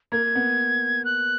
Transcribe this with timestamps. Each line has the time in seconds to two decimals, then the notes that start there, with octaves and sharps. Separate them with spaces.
0.12 A#3 G#6
0.35 B3
1.05 F#6